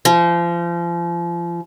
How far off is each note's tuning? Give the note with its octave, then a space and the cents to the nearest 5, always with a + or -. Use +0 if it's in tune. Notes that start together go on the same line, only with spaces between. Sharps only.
F3 -30